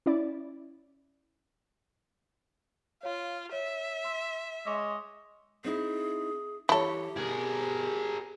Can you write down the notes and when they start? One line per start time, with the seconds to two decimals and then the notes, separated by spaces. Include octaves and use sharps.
0.06 C#4 E4 D5
3.03 F4 C#5 F5
3.52 C#5 E5
4.04 C6 E6 B6
4.66 G#3 C#5 D#5 C6 D6 E6
5.64 C4 D#4 E4 G#4
6.69 E3 E4 G4 A4 C#5
7.17 B2 G#4 A#4